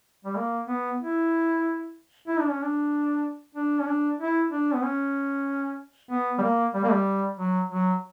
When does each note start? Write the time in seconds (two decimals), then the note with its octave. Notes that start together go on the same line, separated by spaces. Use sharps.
0.25 G3
0.37 A#3
0.68 B3
1.01 E4
2.28 E4
2.40 D4
2.51 C#4
2.63 D4
3.55 D4
3.80 C#4
3.87 D4
4.20 E4
4.51 D4
4.74 B3
4.84 C#4
6.11 B3
6.38 G3
6.43 A#3
6.74 G3
6.83 A#3
6.91 G3
7.37 F#3
7.70 F#3